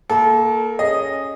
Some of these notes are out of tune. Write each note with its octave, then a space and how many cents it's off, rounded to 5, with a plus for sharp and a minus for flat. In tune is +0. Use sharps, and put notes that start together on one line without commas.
A#3 +0 A4 -25
C#4 +0 G#4 -20 D#5 -5